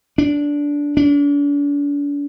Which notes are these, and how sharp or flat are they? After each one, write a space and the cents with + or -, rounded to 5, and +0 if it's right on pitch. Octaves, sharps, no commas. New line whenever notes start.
D4 -15
D4 -40